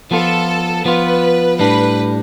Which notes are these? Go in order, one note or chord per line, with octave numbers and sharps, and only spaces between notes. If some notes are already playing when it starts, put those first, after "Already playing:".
F3 B3 F4 A4
F3 B3 F4 B4
A2 G3 D4 B4